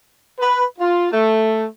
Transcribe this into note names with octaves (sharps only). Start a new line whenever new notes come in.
B4
F4
A3